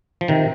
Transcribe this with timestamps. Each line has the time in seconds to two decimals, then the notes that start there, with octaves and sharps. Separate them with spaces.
0.21 F3
0.28 C3 D#3